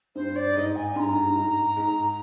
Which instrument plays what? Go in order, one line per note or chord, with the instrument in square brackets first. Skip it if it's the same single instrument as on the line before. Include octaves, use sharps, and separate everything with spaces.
[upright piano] G2 [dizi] C5
[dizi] D5
[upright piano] G#2 [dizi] D#5
[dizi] G#5
[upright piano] G2 [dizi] C6
[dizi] A#5
[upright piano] G2
G#2
G#2